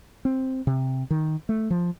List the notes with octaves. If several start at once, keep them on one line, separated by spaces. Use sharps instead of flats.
C4
C3
D#3
A3
F3